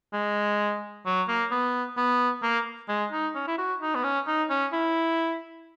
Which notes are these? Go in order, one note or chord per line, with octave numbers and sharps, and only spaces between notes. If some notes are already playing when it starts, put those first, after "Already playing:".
G#3
F#3
A#3
B3
B3
A#3
G#3
D#4
C#4
E4
F#4
D#4
B3
C#4
D#4
C#4
E4